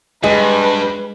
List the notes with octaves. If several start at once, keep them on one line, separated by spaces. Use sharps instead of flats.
G2 G#3 B4 D#5